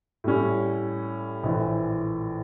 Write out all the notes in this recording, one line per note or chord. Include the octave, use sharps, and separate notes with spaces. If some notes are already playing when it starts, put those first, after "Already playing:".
A2 G3 C#4
A#1 A2 E3